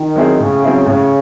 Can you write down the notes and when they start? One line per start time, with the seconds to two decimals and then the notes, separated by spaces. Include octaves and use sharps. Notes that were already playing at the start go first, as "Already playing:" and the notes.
Already playing: D#3
0.16 F#3 C4 E4 G#4
0.39 A2 C#3
0.63 F#3 C4 E4 G#4
0.86 A2 C#3